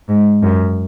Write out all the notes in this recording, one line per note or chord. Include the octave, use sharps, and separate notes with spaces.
G#2
F#2